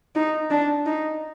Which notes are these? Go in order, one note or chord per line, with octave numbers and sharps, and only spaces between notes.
D#4
D4
D#4